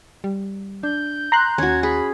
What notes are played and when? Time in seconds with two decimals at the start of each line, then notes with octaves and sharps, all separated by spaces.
0.24 G3
0.83 D4 G6
1.32 A#5 C6 F#6
1.58 D#2 C#4 F#4 G#6
1.83 G#4 B5